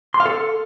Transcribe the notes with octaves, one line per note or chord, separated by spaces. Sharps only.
C6
F5
A4